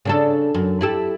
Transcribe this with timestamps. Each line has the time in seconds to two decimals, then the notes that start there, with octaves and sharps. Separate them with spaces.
0.05 C#3 D4 A4
0.54 F#2
0.81 E4 G4 A4